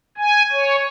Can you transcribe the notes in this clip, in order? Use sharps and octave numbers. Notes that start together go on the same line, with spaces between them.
G#5
C#5